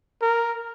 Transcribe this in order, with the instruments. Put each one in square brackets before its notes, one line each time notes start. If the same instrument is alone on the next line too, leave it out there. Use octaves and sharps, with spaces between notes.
[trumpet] A#4